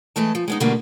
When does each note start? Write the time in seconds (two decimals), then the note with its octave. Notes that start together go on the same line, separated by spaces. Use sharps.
0.16 E3 G#3 A3 A5
0.35 F3
0.48 G#3 B3 D#4
0.60 B2 D3 G3 A3 A#3